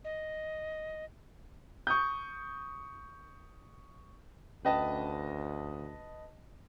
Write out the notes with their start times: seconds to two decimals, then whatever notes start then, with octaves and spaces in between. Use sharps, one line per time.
0.04 D#5
1.87 C#6 D#6 G6
4.65 D2 C#4 B4 D#5 A5